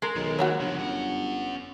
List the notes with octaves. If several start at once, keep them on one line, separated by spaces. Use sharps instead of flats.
G#3 A#4
B1 D#3
D#2 F#3 F#4 A#4 C#5
G1 C#3 F3
C#4 F#5